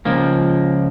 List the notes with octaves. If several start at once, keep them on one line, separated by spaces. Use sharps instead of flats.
C#2 F3 A#3